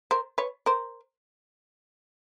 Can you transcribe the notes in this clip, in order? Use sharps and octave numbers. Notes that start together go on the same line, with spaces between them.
A#4 C5
B4 C#5
A#4 C5